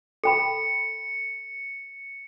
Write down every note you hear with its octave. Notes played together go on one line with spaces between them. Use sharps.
A4 G5 B5 C#7